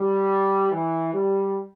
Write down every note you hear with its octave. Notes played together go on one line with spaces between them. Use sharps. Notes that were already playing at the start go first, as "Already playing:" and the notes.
Already playing: G3
E3
G3